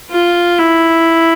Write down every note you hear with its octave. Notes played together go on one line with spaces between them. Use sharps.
F4
E4